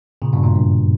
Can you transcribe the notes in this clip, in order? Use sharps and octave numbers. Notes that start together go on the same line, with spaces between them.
A#2 C#3
G2 B2
F#2 A#2
G2